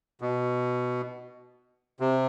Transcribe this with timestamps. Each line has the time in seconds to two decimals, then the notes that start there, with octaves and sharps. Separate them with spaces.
0.21 B2
2.00 C3